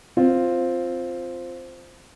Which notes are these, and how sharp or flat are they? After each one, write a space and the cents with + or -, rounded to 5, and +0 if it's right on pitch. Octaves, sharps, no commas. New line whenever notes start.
C4 +0 F4 +0